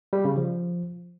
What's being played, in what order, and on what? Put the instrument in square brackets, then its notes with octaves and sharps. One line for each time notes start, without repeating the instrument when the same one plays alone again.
[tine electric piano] G3
C#3
F3